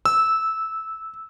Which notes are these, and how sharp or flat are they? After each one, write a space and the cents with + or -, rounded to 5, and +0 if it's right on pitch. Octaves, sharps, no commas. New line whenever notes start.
E6 -10